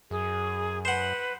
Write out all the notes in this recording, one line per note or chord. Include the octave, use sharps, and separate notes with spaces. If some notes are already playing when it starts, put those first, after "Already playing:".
F#2 G#4
B4 C5 F#5